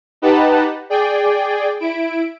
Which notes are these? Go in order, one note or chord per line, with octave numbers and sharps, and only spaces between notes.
D#4 G4 B4 F#5 A5
G#4 D5 G5
E4 D7